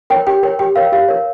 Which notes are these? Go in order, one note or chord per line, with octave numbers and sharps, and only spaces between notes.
A#4 C#5 G5
G4 G5
A#4 C#5 G5
G4 G5
A#4 C#5 F5
G4 F5
A#4 C#5